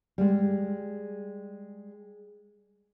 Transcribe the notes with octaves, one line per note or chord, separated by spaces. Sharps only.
G3 G#3